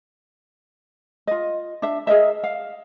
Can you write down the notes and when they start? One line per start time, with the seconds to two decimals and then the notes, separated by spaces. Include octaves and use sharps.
1.27 F4 D#5
1.82 D4 E5
2.07 G#4 A#4 D#5 E5
2.44 F5